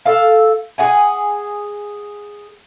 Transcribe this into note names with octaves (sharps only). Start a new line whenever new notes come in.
A4 F5
G#4 F#5 G#5